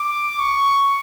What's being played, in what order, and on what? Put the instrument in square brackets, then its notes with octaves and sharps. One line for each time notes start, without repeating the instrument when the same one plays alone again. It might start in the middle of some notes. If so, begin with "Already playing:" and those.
Already playing: [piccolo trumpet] D6
C#6